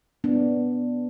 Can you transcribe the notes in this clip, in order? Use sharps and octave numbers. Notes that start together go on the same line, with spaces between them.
B3 D4